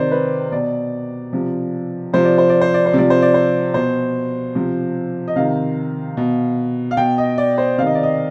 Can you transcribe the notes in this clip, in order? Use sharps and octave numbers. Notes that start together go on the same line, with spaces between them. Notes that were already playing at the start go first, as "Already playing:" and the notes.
Already playing: C3 D#3 C5 D5
B4
B2 D5
C3 F3
C3 F3 C5
D5
C5
D5
C5
D5
C5
C3 F3 D5
C5
D5
C5
B2 C5
C3 F3
D#5
C3 D#3 F5
B2
F5
B2 G5
D#5
D5
C5
C3 D#3 D#5 F5
D5
D#5